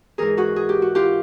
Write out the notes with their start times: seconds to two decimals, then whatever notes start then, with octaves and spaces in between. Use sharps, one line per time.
0.18 G#2 E3 G#4 A#4
0.37 F#4 G#4
0.56 G#4
0.69 G4
0.82 F#4
0.95 F4 G4